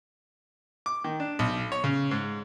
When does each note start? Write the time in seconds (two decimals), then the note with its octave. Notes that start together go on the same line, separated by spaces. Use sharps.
0.86 D6
1.04 D#3
1.20 D4
1.39 B1
1.72 C#5
1.84 C#3
2.11 G#2